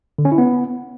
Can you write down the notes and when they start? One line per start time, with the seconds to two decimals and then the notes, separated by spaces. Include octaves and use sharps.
0.18 D3
0.25 C#4
0.32 E4
0.38 B3